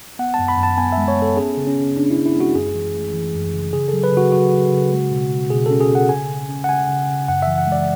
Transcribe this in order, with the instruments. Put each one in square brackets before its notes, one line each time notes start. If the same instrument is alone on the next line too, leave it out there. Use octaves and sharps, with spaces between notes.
[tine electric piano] B3 F#5
F#2 A5
B5
F#2
A5
B3 G#5
G#3 E5
C#5
B3 A4
C#4 G#4
C#3
C#4
C#3
C#4 D4
E4
C#4
E4
G#3 F#4
F#2 G#4
E3
A3
E3
F#2
C#3
C#3 G#4
F#3 A4
B4
C#3 F#4
F#3 F#4
C#3
C#3
G#3
B2
B2
B2 G#4
C#4 A4
G#4
B2
F#5
C#3 G#5
C#3
C#4
F#5
C#3 G#5
C#3
C#3
F#2 F#5
E3 E5
F#5
G#3
D5